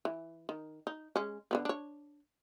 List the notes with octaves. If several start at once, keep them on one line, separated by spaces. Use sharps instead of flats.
E3
D#3
D#4
G#3 C#4
D3 G3 B3
D4 C#5